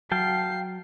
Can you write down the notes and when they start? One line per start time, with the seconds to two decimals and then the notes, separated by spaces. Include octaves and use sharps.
0.12 F#3 F5 G5 A5 C7